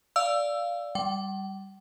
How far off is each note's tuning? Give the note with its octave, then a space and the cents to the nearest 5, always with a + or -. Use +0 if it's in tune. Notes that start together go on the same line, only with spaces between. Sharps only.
D5 -5 F5 +0 E6 +10
G3 -5 G5 -45